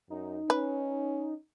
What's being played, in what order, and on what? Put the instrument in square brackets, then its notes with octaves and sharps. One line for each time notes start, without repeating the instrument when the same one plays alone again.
[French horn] F#2 [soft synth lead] D#4
[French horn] C#4 [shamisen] B4